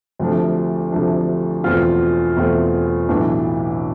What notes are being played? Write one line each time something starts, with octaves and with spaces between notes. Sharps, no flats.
D2 C3 F3 A3 D4
D2 C3 F3 A3 D4
E2 B2 A3 C4 F4
E2 B2 A3 C4 F4
B1 A2 E3 B3 D4